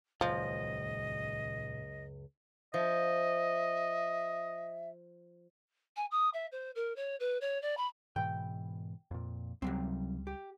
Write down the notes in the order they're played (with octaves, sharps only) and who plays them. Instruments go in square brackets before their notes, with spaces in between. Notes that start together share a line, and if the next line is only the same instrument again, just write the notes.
[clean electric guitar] C#2 F#2 [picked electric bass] A#2 D#3 [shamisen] F3 [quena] D#5
[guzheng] F3 [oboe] D#5 [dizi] E5
[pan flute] G#5
D#6
E5
C5
A#4
C#5
B4
C#5
D5
B5
[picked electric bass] G#2 B2 E3 [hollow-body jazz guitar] G5
[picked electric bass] F2 A#2
[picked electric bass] C#2 G3 [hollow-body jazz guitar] C3 F#3 C4
[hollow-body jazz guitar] G4